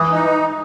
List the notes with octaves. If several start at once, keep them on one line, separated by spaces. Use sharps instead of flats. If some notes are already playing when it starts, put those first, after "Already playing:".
Already playing: E3 D#6
D#4